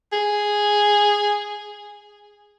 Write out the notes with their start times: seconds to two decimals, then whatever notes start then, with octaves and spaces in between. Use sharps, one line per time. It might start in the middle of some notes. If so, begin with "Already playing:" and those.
0.12 G#4